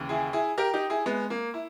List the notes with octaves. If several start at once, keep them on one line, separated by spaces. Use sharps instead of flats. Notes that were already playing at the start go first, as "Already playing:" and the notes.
Already playing: D#2 C#3 E3
E4 G#4
E4 G#4
G4 A#4
D#4 G4
E4 G#4
G#3 B3
A#3
E4